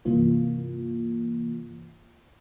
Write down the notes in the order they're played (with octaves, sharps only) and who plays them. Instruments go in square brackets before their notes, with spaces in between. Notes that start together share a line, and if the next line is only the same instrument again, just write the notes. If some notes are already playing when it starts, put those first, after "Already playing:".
[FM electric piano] G2 C3 E3 A#3 F4